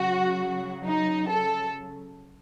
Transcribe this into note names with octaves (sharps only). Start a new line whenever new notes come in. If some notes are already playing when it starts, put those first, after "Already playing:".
Already playing: C#3 F#3 F#4
D#4
A4